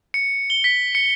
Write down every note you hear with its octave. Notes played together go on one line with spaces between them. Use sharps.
C#7
G7
B6
C#7